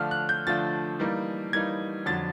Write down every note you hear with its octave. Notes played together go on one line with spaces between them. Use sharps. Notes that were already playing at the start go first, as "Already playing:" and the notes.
Already playing: D3 F3 A3 D4 F4 F6
F#6
G6
D3 F3 A3 D4 F4 A6
E3 G3 A#3 D#4
E3 G3 A#3 D#4 G#6
F2 D3 F#3 A6